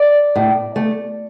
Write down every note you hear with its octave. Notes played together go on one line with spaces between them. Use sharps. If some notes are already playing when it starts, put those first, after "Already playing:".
Already playing: D5
A2
A3